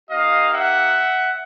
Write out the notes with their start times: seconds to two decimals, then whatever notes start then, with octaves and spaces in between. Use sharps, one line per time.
0.08 A#3 D#4 G4 D#5 F5
0.51 E5 F#5